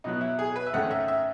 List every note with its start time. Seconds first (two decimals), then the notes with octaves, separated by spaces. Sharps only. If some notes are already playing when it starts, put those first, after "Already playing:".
0.04 B2 F#3 B3 D#4
0.21 E4
0.39 G#4
0.56 B4
0.67 E5
0.73 G#2 D#3 A3 C#4 F#5
0.91 E5
1.08 E5